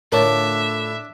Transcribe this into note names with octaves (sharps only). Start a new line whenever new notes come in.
A2 D3 D4 F4 A#4 C#5 E5